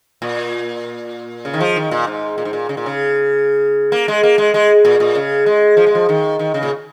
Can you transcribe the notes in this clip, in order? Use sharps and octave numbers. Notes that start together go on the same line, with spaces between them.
A#2
C#3
D#3
F3
D#3
A#2
G#2
A#2
G#2
A#2
C#3
A#2
C#3
A#3
G#3
A#3
G#3
G#3
A#2
A#2
C#3
G#3
F3
G#3
F3
D#3
D#3
C#3
A#2